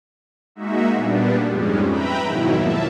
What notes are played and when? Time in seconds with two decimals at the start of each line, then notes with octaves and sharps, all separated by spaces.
0.55 G#3 A#3 D#4 F#4 E5
0.93 A#2 G3 B3 D4
1.48 F2 G#2 G3 G#3 C#4
1.86 B4 E5 G5 A#5 B5
2.25 F2 G#2 B2 D#3 F#3 E4
2.55 A#3 E5 A5